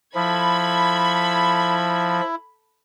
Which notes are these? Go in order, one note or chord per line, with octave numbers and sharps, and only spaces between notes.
F3 E4 A4 B5 G#6